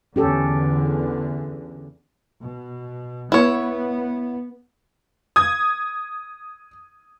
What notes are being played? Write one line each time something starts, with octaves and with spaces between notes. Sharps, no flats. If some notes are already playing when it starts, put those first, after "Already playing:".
E2 D3 C#4 G4 A4
B2
B3 E4 C#5
D#6 G#6